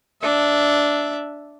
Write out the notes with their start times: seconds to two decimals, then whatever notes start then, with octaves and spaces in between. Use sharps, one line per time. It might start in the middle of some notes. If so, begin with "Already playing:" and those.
0.22 D4 E5